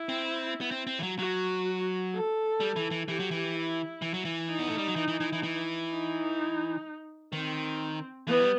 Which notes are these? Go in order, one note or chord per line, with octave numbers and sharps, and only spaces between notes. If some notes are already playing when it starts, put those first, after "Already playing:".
Already playing: E4
C4
B3
C4
C4
E3
F#3
F#3 F#4
A4
G3
E3
E3
E3 G4
F#3
E3
E4
E3
F#3
E3
D#4
B3
A3
G3
F#3
E3
E3
E3
E3
E3
D#4
D#3 C4
E3 B3
G3